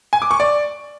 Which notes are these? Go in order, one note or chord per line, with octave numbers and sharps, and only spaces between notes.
G#5
D6
C#6
D5